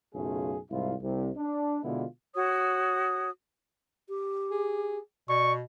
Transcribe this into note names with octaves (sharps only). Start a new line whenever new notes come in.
B1 F#2 C#3 A3 F4 G#4
C2 G#2 E4 F4
C2 C3
D4
B2 D3 G#3 B3 E4 F4
F#4 C#5 D#6
G4
G#4
B2 D5 C#6